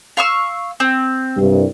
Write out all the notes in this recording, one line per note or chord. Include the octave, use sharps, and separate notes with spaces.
F5 C#6 E6
C4
C2 G2